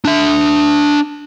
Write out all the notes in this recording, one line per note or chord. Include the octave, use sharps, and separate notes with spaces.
D4 E5